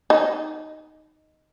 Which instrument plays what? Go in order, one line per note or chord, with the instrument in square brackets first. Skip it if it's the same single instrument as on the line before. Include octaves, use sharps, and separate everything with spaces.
[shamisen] D#4